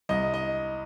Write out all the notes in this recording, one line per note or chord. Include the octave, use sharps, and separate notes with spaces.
C2 D#5
D#5